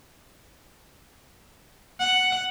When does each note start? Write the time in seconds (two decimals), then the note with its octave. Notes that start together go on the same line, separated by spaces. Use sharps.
2.00 F#5